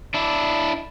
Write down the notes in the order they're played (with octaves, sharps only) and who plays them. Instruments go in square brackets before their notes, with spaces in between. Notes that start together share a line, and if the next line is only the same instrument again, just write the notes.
[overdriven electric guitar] D4 E4